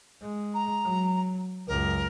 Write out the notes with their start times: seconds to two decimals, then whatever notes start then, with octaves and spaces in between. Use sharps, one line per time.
0.21 G#3
0.53 A#5
0.84 F#3
1.67 C#2 F#2 A#4